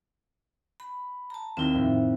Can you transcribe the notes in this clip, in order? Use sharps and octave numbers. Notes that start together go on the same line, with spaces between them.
B5
A5 A#5
D#2 C4 E4 E6 A#6
F2 A2